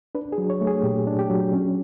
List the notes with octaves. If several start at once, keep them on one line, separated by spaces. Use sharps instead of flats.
D4 B4
G#4
F#3
C#5
A3
G#4
A#2 G4
D4
G4
F#3
C#4